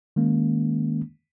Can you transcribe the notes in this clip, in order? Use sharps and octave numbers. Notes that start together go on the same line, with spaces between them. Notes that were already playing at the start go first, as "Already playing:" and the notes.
D#3 G#3 A#3 C#4